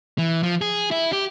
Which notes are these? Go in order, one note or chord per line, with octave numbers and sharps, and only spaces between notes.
E3
F3
G#4
E4
G4